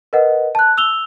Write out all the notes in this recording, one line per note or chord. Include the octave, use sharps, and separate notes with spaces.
A#4 B4 D#5 F#5
A5 F#6
E6 F7 G7